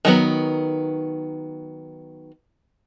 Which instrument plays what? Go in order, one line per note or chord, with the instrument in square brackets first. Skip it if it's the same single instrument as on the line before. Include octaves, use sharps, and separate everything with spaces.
[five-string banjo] D#3 F#3 B3